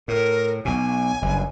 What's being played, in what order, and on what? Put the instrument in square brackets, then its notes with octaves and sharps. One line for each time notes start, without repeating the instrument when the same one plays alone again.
[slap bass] A2 [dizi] A#4
[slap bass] B1 B2 [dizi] G#5
[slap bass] F#1 G2